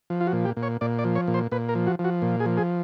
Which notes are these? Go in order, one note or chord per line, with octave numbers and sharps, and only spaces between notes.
F3
F4
F#4
A#2
G4
A#2
C#5
A#2 D5
D5
F3
C#5
A#2
C5
A#2 B4
A#4
F3
F#4
F3
F#4
A#2
G#4
F3
G#4